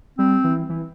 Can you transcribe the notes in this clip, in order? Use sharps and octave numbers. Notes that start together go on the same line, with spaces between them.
G3 C4
E3
E3